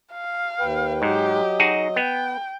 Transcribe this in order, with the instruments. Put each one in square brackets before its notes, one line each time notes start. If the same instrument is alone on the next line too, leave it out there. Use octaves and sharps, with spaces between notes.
[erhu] F5
[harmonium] D#2 B4 G5
[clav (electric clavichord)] G#2 [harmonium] F#3 D#5 [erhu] G4
[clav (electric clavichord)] D#4 F#4 G#4
[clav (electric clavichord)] B3 [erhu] G5